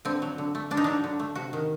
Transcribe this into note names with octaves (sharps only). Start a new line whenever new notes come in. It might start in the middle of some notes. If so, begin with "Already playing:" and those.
D3 C4
F#3
D3
A3
D3 D4
D#4
F#3 D4
D3
A3
C3 F#4
D#3